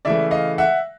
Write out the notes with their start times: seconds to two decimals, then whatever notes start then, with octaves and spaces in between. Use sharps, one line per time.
0.05 C#3 E3 A3 D5 E5
0.31 D#5 F5
0.58 E5 F#5